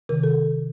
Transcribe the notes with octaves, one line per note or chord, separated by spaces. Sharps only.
C3 D#3 A#4
A4